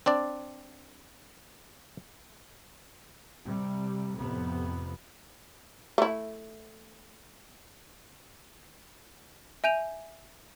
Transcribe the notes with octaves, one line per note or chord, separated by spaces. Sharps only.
C4 D4 D5
C3 G3
F2 A2 C3 B3
A3 E4
E5 G#5 G6 D#7 F7